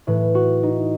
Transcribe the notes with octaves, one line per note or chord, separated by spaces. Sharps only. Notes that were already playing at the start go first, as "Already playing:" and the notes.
A2 E3 B4
F#4
D#4